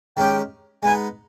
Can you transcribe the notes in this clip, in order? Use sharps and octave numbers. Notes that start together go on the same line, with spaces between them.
D#3 G#3 C#4 G4 G5
G#3 B3 D#4 G#5